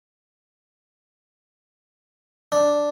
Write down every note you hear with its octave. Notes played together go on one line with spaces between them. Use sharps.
D4